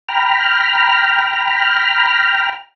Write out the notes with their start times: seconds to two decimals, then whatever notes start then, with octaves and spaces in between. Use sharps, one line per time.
0.09 G5 A#5 B5 F6